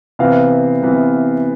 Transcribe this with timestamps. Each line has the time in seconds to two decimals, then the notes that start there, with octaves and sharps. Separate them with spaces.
0.19 C3 E3 B3 F5
0.83 C3 E3 B3